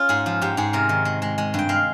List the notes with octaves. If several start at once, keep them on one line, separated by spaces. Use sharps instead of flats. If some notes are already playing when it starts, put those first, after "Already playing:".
Already playing: C#4 F4
G#2 G#4
F3
G#2 G4
G#2 G#4
C3 A#4
D#3
G#3
G#3
G#3
G2 G5
G#3 F5